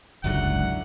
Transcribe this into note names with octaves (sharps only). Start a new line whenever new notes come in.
F#1 C#2 G#2 D3 F#3 E4 F#5